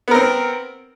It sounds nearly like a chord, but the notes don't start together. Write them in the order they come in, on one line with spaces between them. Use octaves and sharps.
B3 A#4 C4